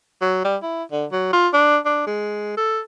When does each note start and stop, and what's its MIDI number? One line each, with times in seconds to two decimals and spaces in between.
0.21 0.41 54
0.44 0.56 55
0.62 0.84 64
0.92 1.06 50
1.12 1.29 54
1.33 1.48 65
1.53 1.77 62
1.86 2.06 62
2.07 2.53 56
2.57 2.81 69